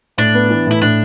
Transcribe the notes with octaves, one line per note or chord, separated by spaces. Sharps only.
A2 D4
B3
E3
A2 E4
A2 D4